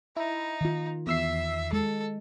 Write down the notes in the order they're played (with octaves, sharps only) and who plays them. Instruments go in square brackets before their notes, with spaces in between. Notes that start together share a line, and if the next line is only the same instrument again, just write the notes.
[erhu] D#4 [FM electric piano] E4
[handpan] D#3 F4
[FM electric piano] E2 E6 C7 [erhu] E5
[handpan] G#3 [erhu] A4